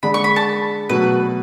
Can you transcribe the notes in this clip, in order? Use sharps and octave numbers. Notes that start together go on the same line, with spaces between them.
D3 G#3 D4 B5
C#6
B5
A5
B2 F#3 A3 B4